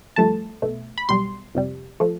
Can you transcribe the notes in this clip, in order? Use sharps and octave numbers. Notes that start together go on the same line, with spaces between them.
G1 G2 F3 A3 A5
B1 B2 A3
B5
B1 B2 G3 C6
F2 C3 G3
F3 A3